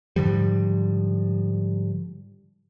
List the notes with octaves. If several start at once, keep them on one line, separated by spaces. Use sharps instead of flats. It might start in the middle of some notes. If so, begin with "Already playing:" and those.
G#2 D3 F3 G3